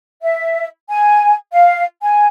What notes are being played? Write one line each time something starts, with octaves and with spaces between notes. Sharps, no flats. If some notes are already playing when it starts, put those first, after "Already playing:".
E5
G#5
F5
G#5